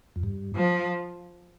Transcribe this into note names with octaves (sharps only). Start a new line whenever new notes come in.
F2
G2
F3